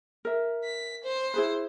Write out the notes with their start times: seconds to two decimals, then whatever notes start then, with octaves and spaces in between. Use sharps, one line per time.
0.25 A#4 E5
0.64 B6
1.04 C5
1.34 E4 G#4 B4